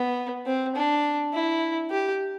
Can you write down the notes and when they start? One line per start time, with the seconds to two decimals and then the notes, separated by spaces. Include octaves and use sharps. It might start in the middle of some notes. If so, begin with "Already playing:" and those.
Already playing: B3
0.46 C4
0.76 D4
1.33 E4
1.91 G4